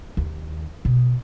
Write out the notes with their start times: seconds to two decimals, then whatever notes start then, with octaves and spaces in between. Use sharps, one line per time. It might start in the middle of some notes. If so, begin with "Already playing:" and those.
0.17 D#2
0.85 B2